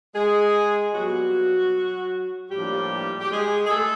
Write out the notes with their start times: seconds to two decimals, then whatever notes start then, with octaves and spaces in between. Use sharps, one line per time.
0.15 G#3 G#4
0.94 A#2 F#3 G3 B3 F#4
2.51 A2 F3 G3 A#3 D4 G4
3.21 G4
3.31 G#3 G#4
3.66 G#4
3.71 A3 A4